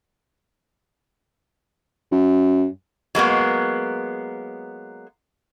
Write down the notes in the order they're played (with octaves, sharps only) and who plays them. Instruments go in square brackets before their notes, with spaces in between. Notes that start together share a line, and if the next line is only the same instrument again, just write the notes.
[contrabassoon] F#2
[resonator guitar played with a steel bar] F#3 G#3 A#3 B3